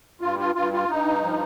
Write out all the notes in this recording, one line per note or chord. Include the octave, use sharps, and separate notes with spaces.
G2 F4
F4
G2 F4
F4
G2 D#4
F3